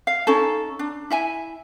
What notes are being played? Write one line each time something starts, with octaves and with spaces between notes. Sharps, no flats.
F5
C#4 D#4 A4
D4
E4 E5 G#5